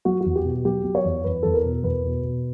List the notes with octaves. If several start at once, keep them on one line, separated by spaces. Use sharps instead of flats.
F#3 F#4
E2 F#4
G4
B2
F#3 G4
F#3
C#5
E2
E2 B4
E2 A4
A#4
B2
E2 B4
B2
B2